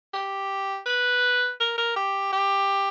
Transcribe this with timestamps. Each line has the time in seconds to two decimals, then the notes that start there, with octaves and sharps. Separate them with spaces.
0.13 G4
0.86 B4
1.60 A#4
1.77 A#4
1.96 G4
2.32 G4